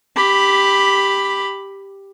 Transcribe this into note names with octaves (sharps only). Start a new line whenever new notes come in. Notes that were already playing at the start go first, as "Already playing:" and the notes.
G4 B5